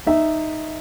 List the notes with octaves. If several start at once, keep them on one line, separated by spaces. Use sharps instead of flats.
D#4 E5